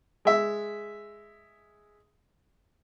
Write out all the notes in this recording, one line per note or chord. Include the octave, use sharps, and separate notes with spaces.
G#3 E5